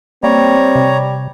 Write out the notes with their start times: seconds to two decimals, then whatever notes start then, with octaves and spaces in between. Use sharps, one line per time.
0.23 G3 A#3 C4 C#5 A#5
0.75 C3